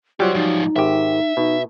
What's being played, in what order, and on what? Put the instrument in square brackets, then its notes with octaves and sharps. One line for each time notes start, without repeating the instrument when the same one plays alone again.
[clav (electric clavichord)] F#3 G3 [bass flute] F4 [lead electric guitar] G4 C5
[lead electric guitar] G#2 F3 [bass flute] D#4
[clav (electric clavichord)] G#1 G4 [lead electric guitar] E5
[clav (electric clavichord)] B2 [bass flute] D#4